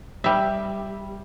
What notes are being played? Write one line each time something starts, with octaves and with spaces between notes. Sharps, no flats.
G3 E5